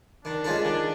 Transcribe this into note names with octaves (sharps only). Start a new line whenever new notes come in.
D#3 D4
G#3 C#4 F4 A4
D#3 D4